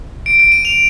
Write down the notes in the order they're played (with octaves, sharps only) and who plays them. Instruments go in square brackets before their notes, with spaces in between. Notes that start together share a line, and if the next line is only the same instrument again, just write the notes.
[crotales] D7
D7
D#7
F7